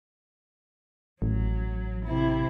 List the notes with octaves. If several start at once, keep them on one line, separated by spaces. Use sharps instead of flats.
A1 F#3
C3 E4